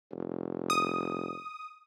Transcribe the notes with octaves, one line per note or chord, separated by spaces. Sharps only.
F1
D#6